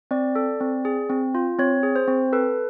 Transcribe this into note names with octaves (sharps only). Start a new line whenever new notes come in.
C4 D5
A4
C4
G#4
C4
F4
C4 C#5
G#4
C5
C4
A4 B4